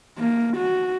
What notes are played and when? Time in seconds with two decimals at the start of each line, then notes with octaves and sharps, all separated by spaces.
0.18 A#3
0.57 F#4